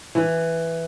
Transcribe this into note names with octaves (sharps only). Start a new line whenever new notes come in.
E3